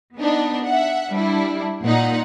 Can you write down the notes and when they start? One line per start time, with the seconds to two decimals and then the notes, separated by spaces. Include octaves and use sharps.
0.16 B3 D4 D#4
0.65 E5 F#5
1.12 G3 D4 E4
1.83 A#2 D#4 F#5